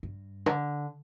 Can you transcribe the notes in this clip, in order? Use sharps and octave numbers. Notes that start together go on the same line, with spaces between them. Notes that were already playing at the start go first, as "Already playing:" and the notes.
G2
D3